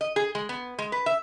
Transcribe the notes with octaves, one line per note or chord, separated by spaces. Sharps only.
D#5
G#4
G#3
B3
G#3
B4
E5